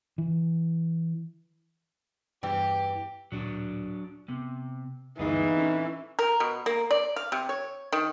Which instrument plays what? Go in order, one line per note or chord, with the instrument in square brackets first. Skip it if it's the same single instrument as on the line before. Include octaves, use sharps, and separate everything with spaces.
[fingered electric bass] E3
[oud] E2 E3 [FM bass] G2 [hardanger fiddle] G4 [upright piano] G5
[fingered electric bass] D1 A#2 [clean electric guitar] F#3 D4
[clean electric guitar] C3 [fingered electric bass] B3
[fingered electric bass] D2 G2 [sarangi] E3 [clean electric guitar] B3 G#4 F5 [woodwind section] D#4
[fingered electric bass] C4 [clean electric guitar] C#4 A4
[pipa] A#4
B2
A#3
D5
F5
C3
C#5
D#3